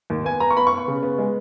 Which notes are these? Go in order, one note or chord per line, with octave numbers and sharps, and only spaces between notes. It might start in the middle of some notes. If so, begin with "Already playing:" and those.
D#2
B3 G#5
B3 A#5
C#6
B3 B5
C#6
B3
C#6
C#3
B3
G#3